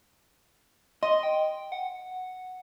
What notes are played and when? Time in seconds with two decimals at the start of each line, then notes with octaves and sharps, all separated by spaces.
1.03 D#5 C6
1.23 G5
1.72 F#5